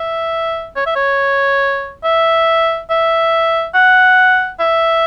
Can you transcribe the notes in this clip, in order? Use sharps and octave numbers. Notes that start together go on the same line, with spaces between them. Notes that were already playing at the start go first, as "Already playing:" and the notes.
Already playing: E5
C#5
E5
C#5
E5
E5
F#5
E5